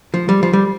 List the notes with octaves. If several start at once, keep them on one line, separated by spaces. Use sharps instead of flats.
F3
G3
F3
G3